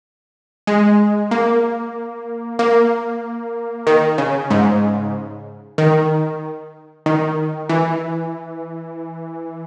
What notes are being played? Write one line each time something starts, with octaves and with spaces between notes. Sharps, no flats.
G#3
A#3
A#3
D#3
C#3
G#2
D#3
D#3
E3